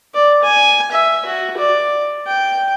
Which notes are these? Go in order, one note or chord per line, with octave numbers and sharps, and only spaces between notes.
D5
G#5
E5
F#4
D5
G5